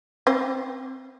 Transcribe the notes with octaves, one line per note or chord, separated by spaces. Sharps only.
C4 C5